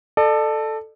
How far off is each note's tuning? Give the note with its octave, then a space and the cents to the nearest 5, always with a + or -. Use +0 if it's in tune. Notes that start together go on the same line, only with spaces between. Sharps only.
A4 +0 D5 +40